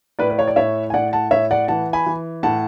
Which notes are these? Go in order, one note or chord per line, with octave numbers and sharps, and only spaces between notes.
A2 B4 D5
B4
C#5
D5
A2 C#5 E5
G#5
A2 D5 F#5
F#5 A5
A2 C#5 E5
D5 F#5
E3 F#5 A5
G#5 B5
E3
A2 F#5 A5